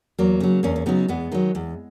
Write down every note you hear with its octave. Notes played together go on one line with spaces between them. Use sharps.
E2 F#3 A#3
C#3 F#3
E2 A#3 C#4
C#4
C#3 F#3 B3 D#4
E2 G#3 B3
D#3 F#3 G#3
E2